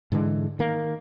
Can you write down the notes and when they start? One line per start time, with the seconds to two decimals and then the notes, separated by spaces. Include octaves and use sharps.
0.12 G#2 D3 E3 G#3
0.59 D#3 A#3